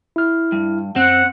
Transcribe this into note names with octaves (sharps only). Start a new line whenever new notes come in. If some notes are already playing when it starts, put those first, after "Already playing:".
E4 F6
G2
F#2 C4 F#5